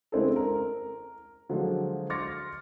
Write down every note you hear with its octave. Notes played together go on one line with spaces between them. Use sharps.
C#3 G#3 C4 D4 E4 A4
A#4
D3 F3 F#3 G#3
C6 D6 F6 A6 A#6 C#7